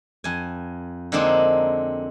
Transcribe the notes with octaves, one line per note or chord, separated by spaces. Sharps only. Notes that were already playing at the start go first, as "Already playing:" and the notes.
F2 G#5
D3 G#3 A#3 C4 D4 D#4